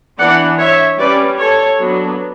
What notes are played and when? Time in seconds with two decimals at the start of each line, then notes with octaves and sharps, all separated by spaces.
0.18 E3 B3 D4 D5 F#5
0.58 C#5 E5
0.98 G3 C#4 B4 D5
1.38 A4 C#5
1.79 F#3 B3 D4